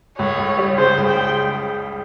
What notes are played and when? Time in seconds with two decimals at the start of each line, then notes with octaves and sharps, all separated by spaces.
0.19 C#2 C#5
0.39 C#2
0.58 G3
0.78 C#3 C5
0.97 C#2
1.08 G5